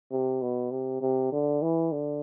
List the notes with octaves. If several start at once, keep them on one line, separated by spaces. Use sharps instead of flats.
C3
B2
C3
C3
D3
E3
D3